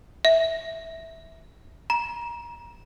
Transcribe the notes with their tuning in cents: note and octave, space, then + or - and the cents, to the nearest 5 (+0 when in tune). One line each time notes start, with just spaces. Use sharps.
E5 -10
A#5 +30